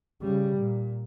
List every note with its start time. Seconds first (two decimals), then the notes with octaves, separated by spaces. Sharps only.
0.22 C#3 G3
0.57 A#2